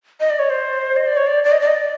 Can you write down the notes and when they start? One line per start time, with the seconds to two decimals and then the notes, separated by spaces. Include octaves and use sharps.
0.20 D#5
0.30 D5
0.39 C#5
0.50 C5
0.96 D#5
1.06 D5
1.17 C#5
1.27 D5
1.44 D5
1.52 D#5
1.60 D5
1.67 D#5
1.76 D5